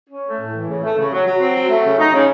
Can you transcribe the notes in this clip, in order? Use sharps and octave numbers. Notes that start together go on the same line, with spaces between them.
C#4
A3
A2
E3
C#3
A3
C#3
F#3
F#3
C4
F#3
A3
C#3
D#4
C#3